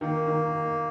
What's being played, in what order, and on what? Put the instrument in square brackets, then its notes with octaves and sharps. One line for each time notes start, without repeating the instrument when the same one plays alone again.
[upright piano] D#3 [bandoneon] A#3
[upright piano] D#3